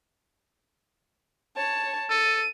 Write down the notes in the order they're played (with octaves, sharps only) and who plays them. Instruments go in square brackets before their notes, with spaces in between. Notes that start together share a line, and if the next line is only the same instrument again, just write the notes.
[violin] C#5 A5
[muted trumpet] A4 [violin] D#7